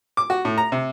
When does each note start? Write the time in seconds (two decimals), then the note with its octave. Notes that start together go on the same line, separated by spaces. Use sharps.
0.17 D6
0.30 F#4
0.45 A2
0.58 A#5
0.72 C3